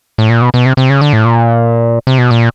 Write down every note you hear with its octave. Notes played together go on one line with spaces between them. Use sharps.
A2
A#2
B2
B2
C3
C3
C#3
D3
A2
A#2
C3
B2
A#2